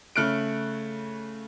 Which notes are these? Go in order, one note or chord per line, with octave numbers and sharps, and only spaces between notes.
C#3 A3 F6 F#6 C#7 D7